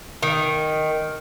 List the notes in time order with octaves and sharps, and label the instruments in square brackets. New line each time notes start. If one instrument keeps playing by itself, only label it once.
[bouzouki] D#3